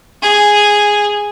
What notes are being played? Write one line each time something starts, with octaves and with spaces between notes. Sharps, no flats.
G#4